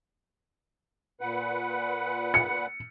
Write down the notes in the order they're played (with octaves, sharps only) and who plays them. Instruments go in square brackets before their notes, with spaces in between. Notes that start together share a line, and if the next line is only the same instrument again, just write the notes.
[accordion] A#2 B4 F#5
[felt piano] C#7